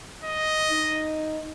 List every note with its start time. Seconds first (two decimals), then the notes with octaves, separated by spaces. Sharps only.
0.24 D#5
0.70 D#4